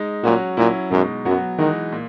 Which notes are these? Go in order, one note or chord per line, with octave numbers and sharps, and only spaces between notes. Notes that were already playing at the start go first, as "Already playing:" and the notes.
Already playing: G#3 D#4
A#2 F#3 C#4 F#4
A#2 F#3 C#4 E4
F#2 B2 G#3 D#4
F#2 F#3 B3 F#4
D#3 E3 G#3 D#4 F#4
A#2